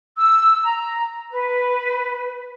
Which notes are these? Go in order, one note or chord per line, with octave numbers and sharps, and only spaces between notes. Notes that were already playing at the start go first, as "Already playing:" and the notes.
E6
A#5
B4